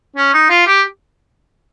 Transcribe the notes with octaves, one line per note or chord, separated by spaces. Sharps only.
C#4
D#4
F4
G4